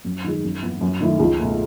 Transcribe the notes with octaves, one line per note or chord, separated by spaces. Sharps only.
F#2
D#3 G#3
F#2
E3 B3
F#2
D#3 A3 E4
C#2
B2 A3